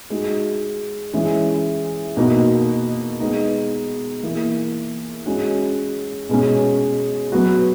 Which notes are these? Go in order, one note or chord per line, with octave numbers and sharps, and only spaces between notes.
G#3 D#4 F#4
E3 G#3 C#4
B2 A#3 D#4 F#4
G#3 B3 D#4
E3 A#3 E4 G#4
G#3 C#4 F#4
B2 G#3 C#4
F#3 B3 F#4